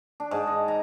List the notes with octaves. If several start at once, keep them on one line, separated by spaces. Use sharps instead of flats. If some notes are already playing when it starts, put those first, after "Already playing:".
D4
G#2
D#5
A#5